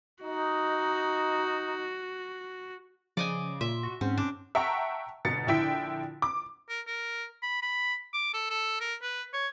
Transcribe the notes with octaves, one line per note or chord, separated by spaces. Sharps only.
D#4 F#4
C#3 F3 D5 D#5 G#5
A#2 E5 C6
F#4
G#2 C4 C#4 F#5
G2 D4
E5 F#5 G5 A5 A#5 C#6
G1 B2 A6 C#7
A#1 D3 E4 G5 B6
D6
A#4
A#4
B5
B5
D6
A4
A4
A#4
B4
C#5